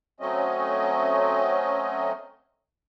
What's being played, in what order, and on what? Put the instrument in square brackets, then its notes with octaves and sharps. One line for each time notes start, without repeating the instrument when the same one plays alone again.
[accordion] F#3 A3 C4 C#4 D#5